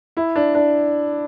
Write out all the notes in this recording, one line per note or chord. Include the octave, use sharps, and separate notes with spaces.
E4
D4
D4